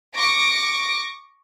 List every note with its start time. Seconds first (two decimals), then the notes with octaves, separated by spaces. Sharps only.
0.15 C#6 D6 A#6 D7